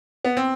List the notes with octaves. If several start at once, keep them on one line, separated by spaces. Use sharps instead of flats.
B3
C4